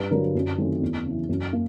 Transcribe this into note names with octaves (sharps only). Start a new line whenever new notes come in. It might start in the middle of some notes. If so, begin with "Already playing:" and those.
Already playing: G2 B4
D3 F#3 A#4
F#2
D#3 F#3 A3 C4
E2
C#3 E3
F#2
A#3